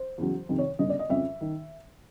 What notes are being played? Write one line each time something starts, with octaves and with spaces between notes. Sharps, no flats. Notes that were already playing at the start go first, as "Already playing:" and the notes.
Already playing: C5
E2 C#3 F#3
F2 C3 D#3
C#5
G1 F#2 C#3 D#5
D5
D#5
F2 C#3 F3 E5
D#3